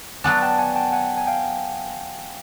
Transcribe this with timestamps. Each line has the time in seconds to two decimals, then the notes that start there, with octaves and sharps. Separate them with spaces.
0.24 F#3 B3 D4 F#5 G#5
0.42 G5 A5
0.58 F#5 G#5
0.76 G5 A5
0.93 F#5 G#5
1.17 G#5
1.27 F5 G5